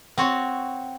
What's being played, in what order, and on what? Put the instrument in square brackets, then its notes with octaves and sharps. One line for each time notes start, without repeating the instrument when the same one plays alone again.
[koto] C4 F#4 C#5